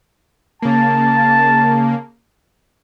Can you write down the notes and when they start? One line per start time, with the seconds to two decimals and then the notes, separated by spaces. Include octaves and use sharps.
0.62 C#3 A#3 A5